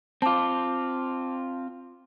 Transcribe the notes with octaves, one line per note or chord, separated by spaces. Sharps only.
C4 F4 A5 D6